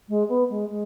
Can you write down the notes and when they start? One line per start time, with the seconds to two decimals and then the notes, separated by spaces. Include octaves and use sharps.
0.08 G#3
0.28 B3
0.49 G#3
0.70 G#3